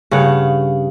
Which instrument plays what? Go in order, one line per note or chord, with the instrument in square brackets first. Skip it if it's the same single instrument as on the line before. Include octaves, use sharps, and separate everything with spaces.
[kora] G2 C#3 F5 F#5